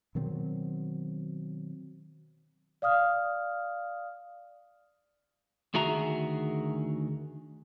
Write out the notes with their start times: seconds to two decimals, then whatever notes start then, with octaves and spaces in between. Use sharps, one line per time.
0.15 B2 D#3 F#3 C4
2.82 D5 F5 D#6 F6
5.74 D2 D#3 F#4 G#4 E5 A#5